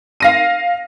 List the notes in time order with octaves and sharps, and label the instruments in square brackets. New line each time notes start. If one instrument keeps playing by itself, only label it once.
[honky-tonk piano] F5 A#6 D#7